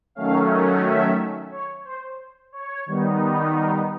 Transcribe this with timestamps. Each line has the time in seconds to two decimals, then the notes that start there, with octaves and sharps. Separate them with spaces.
0.15 D#3 F#3 A3 C#4 F5
0.84 E5
1.51 C#5
1.85 C5
2.52 C#5
2.86 D#3 G3 B3 D#4
3.54 A#4